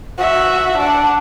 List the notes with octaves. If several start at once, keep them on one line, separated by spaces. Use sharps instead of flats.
F#4 E5
D4 F#5